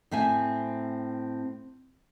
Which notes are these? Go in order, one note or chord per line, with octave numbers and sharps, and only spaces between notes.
A2 C4 E5 G#5